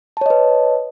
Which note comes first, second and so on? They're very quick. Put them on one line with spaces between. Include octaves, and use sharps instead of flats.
A5 C#5 D#5 B4